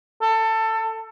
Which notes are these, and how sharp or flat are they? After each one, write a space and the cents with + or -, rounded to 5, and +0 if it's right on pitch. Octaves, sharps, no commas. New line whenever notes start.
A4 +20